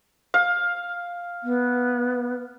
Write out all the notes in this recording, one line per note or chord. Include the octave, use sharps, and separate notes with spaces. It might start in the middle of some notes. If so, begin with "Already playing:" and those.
F5
B3